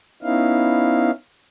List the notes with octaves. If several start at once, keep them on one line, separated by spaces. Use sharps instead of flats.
B3 C#4 D#4 E4 F5